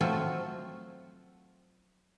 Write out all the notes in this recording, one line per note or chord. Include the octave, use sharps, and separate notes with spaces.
F3 F#3 A3 C4 F4 F#4